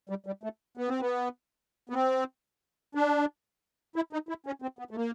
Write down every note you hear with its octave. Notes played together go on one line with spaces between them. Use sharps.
G3
G3
A3
B3
C4
B3
B3
C4
D4
E4
D#4
E4
C#4
C4
B3
A3
A#3